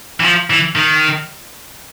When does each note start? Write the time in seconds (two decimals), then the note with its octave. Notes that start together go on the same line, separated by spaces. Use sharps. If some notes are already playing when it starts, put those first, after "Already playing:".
0.20 E3
0.24 F3
0.50 E3
0.76 D#3